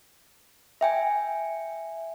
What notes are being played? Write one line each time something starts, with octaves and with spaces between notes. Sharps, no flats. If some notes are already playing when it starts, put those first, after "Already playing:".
E5 G5 G#5